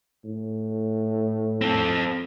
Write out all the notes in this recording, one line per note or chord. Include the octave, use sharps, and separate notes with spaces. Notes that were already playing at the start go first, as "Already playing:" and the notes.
A2
C4 A4